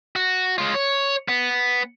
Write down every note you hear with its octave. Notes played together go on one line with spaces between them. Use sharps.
F#4
G#3 F4
C#5
B3